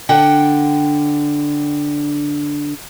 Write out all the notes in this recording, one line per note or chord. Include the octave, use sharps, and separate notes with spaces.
D3 D4 F#5 G5